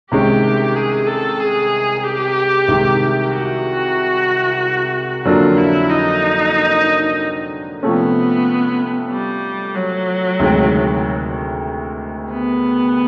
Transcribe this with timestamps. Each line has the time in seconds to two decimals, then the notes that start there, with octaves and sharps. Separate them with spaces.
0.11 C2 C3 D#3 G#3 C#4 G4
0.76 G#4
1.07 A4
1.40 G#4
2.04 G4
2.68 C2 C3 D#3 G#3
3.33 F#4
5.25 F2 D3 F#3 A#3 D4 F4
5.57 E4
5.90 D#4
7.83 C3 F3 A3 B3 C#4
9.11 G3
9.75 F#3
10.39 D2 C3 D#3 G#3
12.32 B3